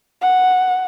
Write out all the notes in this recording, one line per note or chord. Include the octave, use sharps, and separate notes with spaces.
F#5